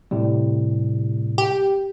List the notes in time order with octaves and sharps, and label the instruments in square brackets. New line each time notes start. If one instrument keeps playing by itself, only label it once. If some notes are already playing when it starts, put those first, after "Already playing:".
[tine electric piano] A2 C3 G3
[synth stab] G4